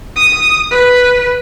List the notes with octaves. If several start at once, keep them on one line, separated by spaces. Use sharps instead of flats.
D#6
B4